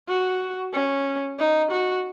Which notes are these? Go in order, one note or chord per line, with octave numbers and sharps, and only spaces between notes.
F#4
C#4
D#4
F#4